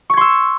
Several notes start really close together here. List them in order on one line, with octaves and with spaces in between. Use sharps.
C#6 G#6 C6 E6